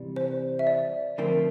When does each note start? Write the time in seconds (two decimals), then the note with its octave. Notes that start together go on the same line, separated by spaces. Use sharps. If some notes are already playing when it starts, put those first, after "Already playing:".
Already playing: C3 E3 G3
0.16 C5
0.59 E5
0.67 D5
1.18 D3 F3 A3 C4 A#4